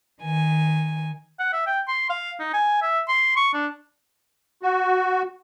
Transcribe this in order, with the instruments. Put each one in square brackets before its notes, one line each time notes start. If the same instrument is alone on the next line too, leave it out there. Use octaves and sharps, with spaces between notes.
[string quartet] D#3 G#5
[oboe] F#5
E5
G5
C6
F5
D#4
G#5
E5
C6
C#6
D4
[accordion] F#4